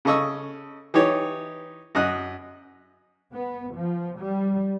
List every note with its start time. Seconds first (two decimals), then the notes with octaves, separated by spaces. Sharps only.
0.05 C#3 A4 D#5 C#6 E6
0.94 E3 D#4 G4 C#5
1.95 F#2 D#5 F#6
3.33 B3
3.74 F3
4.19 G3